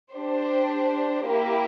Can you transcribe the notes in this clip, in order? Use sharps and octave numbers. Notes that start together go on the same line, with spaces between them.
D4 G4 C5
A#3 E4 G4